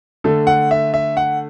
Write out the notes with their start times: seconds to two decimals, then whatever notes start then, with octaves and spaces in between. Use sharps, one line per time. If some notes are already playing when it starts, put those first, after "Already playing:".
0.24 D3 A3 A4
0.47 F#5
0.71 E5
0.94 E5
1.17 F#5